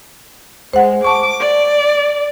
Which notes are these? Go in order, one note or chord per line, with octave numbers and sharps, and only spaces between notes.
G#3 C5 F#5
A5 C#6 D6
D5